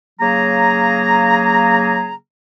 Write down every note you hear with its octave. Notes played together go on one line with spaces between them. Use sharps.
C#3 F#3 A#3 G#4 A#5